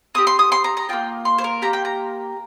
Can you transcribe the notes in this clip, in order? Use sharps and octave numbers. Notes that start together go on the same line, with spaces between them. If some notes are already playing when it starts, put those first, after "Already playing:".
C4 G4 D#6
C6
D#6
C6
A#5
A#5
A#3 F4 G5
C6
C5
A#4
A#3 G4 A#5
G5
A#5